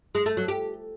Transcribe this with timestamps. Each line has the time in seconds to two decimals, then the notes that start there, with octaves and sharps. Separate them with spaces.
0.15 G#3
0.26 A3
0.37 F#3
0.48 G4